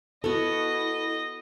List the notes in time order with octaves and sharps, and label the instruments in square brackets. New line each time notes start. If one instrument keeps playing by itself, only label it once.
[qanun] B3 F#4 [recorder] E4 [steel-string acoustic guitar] A4 [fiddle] D#5